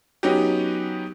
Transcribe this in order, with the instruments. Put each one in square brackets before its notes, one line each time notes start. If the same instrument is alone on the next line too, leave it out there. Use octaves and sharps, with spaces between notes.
[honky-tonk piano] F#3 B3 C#4 D#4 F#4 G4